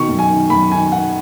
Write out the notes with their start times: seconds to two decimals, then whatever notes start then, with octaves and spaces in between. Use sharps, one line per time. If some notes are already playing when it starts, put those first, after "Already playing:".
Already playing: B2 D#3 C#6
0.09 F#2
0.19 G#5
0.29 D#3
0.50 F#2 B5
0.72 D#3 G#5
0.92 D#3 F#5